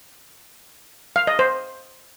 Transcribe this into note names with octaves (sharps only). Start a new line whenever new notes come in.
F5
D#5
C5